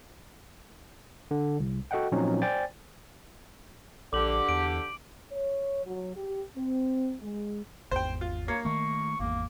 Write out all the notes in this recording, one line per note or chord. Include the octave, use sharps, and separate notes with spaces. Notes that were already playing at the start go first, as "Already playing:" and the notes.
D3
C2
F#4 A4 D#5 F#5 G5
A#2 F3 F#3 C4 C#4 D#4
C5 D5 G5 G#5 A6
A#1 D3 G4 D6 F#7
E2 D7
C#5
F#3
G4
C4
G#3
G#1 E2 C5 G5
F4
A#3 C#5
D#3 A3 C#6
G#1 E2 A#3